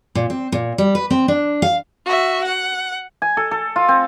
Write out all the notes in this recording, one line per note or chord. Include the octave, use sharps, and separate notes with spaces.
A#2
C4
A#2
G3
B4
C4
D4
F5
F#4 E5
F#5
G#5
A4
A4
F4
C4